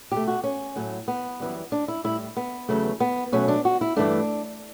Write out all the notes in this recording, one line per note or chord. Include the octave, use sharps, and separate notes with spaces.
B2 A3 G4
F#4
C#4
A2 F#3 A3
B3
F#2 E3 G3
D4
E4
A2 G3 E4
B3
E2 C#3 F#3 A3
B3
B2 F#3 A3 C#4
D4
F#4
E4
G2 E3 A3 D4